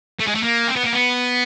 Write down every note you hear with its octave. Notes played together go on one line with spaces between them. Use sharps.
A3
G#3
A3
A#3
C4
B3
A#3
B3